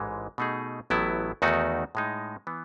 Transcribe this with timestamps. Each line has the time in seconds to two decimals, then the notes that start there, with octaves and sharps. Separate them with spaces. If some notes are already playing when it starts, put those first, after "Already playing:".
Already playing: A1 G#2 E3 G#3
0.38 B2 A3 D#4 G#4
0.90 A1 A2 F#3 B3 E4
1.42 E2 D#3 A3 D#4 F#4
1.95 A2 G#3 D#4
2.47 E3 B3